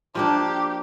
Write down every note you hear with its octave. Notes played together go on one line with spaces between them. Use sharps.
F3 A#3 D4 G4